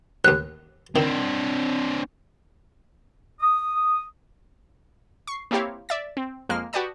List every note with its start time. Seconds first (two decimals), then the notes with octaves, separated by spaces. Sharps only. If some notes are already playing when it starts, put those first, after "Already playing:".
0.25 A1 D#2 F#6
0.96 D#3 C4 D4
3.40 D#6
5.27 C#6 C7
5.51 A#3 C4 E4 G4 C#5 F5
5.89 D5 E5 A6
6.17 C4
6.49 F2 G#3 A#3 F6
6.73 F#4 G4 B4 D5 A5 D#6